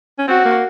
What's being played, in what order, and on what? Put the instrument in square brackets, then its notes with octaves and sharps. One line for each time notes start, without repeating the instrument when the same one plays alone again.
[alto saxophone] C#4
[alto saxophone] C4 [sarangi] F#4
[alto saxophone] A#3